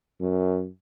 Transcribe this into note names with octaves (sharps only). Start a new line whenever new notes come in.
F#2